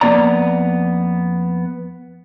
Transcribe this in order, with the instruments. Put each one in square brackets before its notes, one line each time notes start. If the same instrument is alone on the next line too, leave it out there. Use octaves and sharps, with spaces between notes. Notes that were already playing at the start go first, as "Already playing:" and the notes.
[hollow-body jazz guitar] F2 F3 A#3 B3 D5 A#5